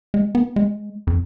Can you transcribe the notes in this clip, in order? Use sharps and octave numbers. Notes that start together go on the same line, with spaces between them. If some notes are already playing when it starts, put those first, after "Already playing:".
G#3
B3
G#3
F2